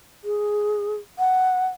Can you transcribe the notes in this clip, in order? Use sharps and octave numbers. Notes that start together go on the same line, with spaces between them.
G#4
F#5